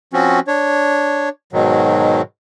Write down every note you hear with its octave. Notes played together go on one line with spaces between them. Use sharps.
F3 C4 C#4 F#4
D4 C#5
G#2 B2 D#3 F#3